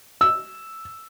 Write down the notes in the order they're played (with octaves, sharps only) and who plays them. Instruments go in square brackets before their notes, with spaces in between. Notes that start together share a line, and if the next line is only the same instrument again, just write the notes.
[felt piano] E6